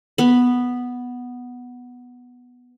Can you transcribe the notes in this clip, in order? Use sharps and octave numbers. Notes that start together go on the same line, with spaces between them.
B3 B5